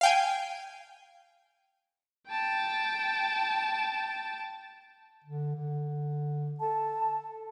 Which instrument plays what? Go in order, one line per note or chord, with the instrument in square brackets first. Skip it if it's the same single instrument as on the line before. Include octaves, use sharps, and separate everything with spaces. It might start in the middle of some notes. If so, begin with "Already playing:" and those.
[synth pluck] F5 G5 G#5
[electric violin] G5 A5
[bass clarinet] D3
D3
[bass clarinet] A4 [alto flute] A5